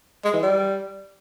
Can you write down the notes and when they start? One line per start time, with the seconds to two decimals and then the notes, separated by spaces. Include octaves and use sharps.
0.24 G#3
0.33 E3
0.43 G3